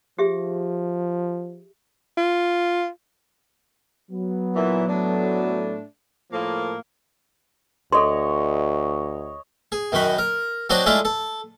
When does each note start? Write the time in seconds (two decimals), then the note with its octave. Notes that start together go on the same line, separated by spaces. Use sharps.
0.19 F3 G4 G#4 E5
2.17 F4
4.10 F#3 B3
4.54 A#2 E3
4.87 A2 A3 D4
6.32 A2 F3 A#3
7.92 D2 A4 C#5 D#5 C6
9.72 G#4
9.92 F#2 D#3 F#4 B5
10.18 A#4
10.70 F#3 C4 D4 F#4 D5 D#5
10.86 G#3 A3 D4 E4 F4 A4
11.05 A4